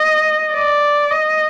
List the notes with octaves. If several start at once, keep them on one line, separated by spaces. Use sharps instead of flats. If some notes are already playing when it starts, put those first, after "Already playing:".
Already playing: D#5
D5
D#5